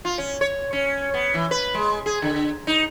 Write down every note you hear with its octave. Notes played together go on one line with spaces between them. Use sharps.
F4
C#4
C#5
C#4
B3
E3
B4
G#3
G#4
D3
D#4